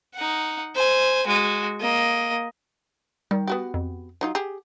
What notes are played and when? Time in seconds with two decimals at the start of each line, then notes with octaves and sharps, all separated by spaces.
0.15 D#4 F#5
0.75 C5 G#5
1.27 G#3 F#4
1.80 A#3 D#5
3.31 D#3 G3
3.48 B3 F#4 G4
3.74 F2
4.21 F#3 D#4 F4 F#5
4.35 G4 G#4